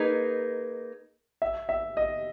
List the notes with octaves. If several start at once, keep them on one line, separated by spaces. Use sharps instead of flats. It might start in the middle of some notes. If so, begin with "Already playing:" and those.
Already playing: A#3 D#4 G#4 B4
E5
E5
D#5